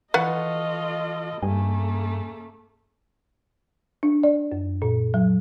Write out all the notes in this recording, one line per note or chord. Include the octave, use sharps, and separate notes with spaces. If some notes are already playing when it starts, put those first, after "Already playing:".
E3 F4 A4 B4 D5 D#5 F#5 C#6
G2 C#3 A3 A#3 G#5
D4
D5
F#2
A#2
F#3